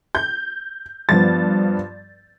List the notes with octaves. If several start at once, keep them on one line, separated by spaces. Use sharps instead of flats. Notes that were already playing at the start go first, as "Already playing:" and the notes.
G6
G2 F3 B3 A6